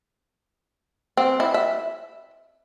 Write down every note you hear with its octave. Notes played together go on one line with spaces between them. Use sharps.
C4
E4
E5